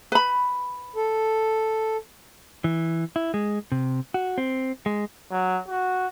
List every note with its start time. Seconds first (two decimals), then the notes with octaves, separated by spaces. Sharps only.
0.12 B4 B5
0.96 A4
2.64 E3
3.16 E4
3.34 G#3
3.72 C3
4.14 F#4
4.38 C4
4.86 G#3
5.31 F#3
5.68 F#4